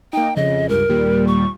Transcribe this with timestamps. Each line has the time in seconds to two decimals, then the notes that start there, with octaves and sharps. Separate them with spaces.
0.13 A#3 D#4 G5
0.36 F2 C#3 D#5
0.69 C#2 G2 A#4
0.89 D#2 A#2 G3
1.27 C#6